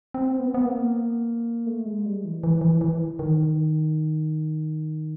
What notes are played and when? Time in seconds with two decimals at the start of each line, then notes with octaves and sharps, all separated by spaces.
0.14 C4
0.40 B3
0.48 C4
0.54 B3
0.65 A#3
1.66 A3
1.85 G#3
2.05 G3
2.24 E3
2.43 E3
2.61 E3
2.81 E3
3.19 D#3